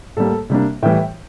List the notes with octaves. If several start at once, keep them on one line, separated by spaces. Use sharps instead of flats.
A2 G3 A#3 A4
C3 G3 A#3 D4
A2 E3 G3 E5 G5